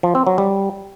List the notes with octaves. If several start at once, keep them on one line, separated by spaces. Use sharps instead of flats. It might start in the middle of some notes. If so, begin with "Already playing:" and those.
F3
C4
F#3
G3